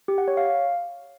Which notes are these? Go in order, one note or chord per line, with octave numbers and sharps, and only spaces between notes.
G4
F#5
C#5
F5